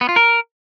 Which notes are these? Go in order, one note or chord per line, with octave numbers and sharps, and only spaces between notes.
B3
F4
A#4